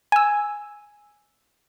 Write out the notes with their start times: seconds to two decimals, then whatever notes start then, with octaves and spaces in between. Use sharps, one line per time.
0.12 G#5 E6